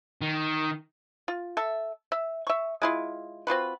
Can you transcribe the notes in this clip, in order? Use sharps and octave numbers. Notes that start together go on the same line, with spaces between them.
D#3
F4
A4 E5
E5
E5 C#6
G#3 E4 F4
C4 F4 F#4 B4